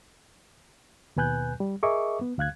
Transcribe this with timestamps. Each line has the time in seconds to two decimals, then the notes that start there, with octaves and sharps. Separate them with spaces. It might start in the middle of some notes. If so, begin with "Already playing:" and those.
1.16 D#2 B2 B4 G#5 F#6 G6
1.60 G3
1.83 G#4 A#4 D#5 E5 C#6 D6
2.21 B3
2.38 D2 F5 F#6 G#6